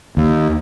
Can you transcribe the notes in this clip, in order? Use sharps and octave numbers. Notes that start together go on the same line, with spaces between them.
D#2